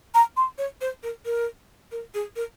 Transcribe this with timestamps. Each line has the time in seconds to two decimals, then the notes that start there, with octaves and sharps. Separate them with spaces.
0.14 A#5
0.37 C6
0.58 C#5
0.81 C5
1.03 A#4
1.25 A#4
1.92 A#4
2.14 G#4
2.36 A#4